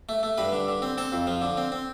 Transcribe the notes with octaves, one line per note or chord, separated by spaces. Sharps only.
A3
A3
G2 B4
D3
D3
C4
C4 A4
F2
F3
D3
C4
C4